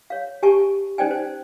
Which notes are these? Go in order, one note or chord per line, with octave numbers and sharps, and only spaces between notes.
C#5 F5
G4 G#5 A5 C#6
C#4 D#4 C5 D5 G5 G#5
C5